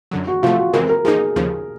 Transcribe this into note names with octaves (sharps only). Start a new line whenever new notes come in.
F#2 D3 F#3
F#4
C3 F3 A3 F4
F#4
F2 C#3 E3 G#3 C4 A#4
A#4
F3 A#3 D#4 G#4
D#2 C#3 F3